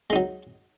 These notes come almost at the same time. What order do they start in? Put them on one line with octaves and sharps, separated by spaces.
G#3 D#4 F#3